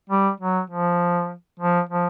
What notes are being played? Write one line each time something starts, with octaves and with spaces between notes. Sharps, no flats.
G3
F#3
F3
F3
F3